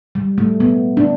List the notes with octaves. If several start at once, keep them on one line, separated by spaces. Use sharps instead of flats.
G3
A3
B3
D4